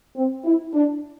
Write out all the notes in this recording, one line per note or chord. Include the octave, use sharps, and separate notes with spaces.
C4
E4
D4